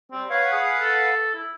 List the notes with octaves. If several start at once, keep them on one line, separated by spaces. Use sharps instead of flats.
G3 C4
B4 C#5 F5 F#5
G#4
A4
E4